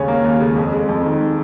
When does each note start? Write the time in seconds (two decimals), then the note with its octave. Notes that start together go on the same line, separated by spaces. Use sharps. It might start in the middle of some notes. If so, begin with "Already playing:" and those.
Already playing: D#2 C#3 C#4
0.08 A#3
0.24 D#2
0.40 C#3
0.57 F2
0.73 G#3
0.89 F2
1.05 D#3